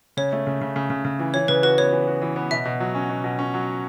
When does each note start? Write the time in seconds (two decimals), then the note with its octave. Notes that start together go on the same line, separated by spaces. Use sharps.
0.17 C#3 C#5
0.33 A3
0.47 C#3
0.61 C#3
0.76 C#3
0.90 C#3
1.05 C#3
1.19 E3
1.34 E3 C#5
1.48 C#3 B4
1.63 F#4 B4
1.78 B3 C#5
1.92 E3
2.07 F#4
2.22 E3
2.36 B3
2.51 B2 E5
2.65 B2
2.80 F#3
2.95 C#4
3.09 B2
3.24 B2
3.39 C#4
3.54 F#3